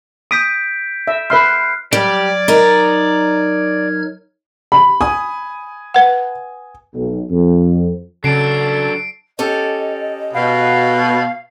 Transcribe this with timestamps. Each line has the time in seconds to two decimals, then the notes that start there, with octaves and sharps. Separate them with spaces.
0.31 D#6 G6 B6 D7
1.07 E5
1.30 B4 E5 C6 F6 F#6 C7
1.93 F#3 G3 D5 F6 G#6
2.48 D#4 A#4
4.72 B5
5.01 G#5 D#6
5.94 B4 F#5
6.94 B1
7.30 F2
8.24 C#3 F#3 D4 A4 C7 D7
9.39 C#4 G4 A4 D#5
10.34 B2 F5